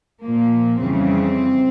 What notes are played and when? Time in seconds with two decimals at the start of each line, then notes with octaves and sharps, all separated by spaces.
0.22 A#2 F3 A#3
0.82 F2 C#3 E3 G3 C4